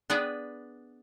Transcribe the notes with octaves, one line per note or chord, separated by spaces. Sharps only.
B3 D4 G#4 B4 D5